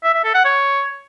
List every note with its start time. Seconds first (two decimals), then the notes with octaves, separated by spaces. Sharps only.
0.04 E5
0.14 E5
0.24 A4
0.34 F#5
0.45 C#5